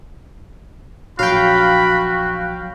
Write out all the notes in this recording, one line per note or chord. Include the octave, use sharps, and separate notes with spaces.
A#1 F#3 F#4 F5 G5 B5